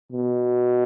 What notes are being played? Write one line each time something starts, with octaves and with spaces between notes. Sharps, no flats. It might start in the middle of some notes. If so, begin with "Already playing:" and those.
B2